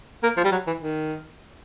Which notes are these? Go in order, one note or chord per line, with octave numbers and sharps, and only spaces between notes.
A#3
F3
G3
F#3
E3
D#3